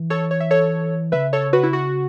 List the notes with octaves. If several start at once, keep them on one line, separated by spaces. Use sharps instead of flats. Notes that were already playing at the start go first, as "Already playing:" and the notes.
Already playing: E3
A4 C#5
C#5
E5
A4 C#5
C#3 B4 E5
A4 C#5
F#4 B4
E4
F#4